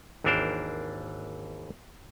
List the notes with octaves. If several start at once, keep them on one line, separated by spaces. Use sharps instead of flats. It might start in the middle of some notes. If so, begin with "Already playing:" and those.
G#1 D#2 E3 D4 A#4 C5